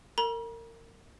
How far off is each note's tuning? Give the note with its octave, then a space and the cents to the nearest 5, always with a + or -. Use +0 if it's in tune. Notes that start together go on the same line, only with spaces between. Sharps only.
A#4 -30 A#5 +45